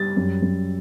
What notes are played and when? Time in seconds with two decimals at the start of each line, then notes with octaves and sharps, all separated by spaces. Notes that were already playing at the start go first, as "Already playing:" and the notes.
Already playing: G3 A6
0.17 F#2
0.42 F#2